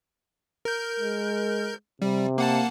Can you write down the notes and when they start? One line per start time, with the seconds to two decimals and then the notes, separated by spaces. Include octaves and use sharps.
0.65 A#4 G6
1.00 G#3
2.02 C3 G3
2.38 A#3 F#5 A5